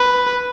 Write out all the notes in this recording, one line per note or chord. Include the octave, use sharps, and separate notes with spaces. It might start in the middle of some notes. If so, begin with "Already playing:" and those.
Already playing: B4